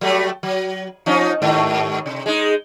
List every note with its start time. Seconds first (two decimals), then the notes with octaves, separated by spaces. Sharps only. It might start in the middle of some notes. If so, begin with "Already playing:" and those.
0.01 F#3 G3 A3
0.43 F#3
1.06 F3 C#4 D#4
1.42 D#2 G#2 A3
2.06 C3
2.26 G#3 D#4